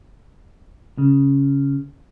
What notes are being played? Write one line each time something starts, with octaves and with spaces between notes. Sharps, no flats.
C#3